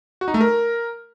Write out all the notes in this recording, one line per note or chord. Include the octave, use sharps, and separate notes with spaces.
F#4
D#4
A3
A#4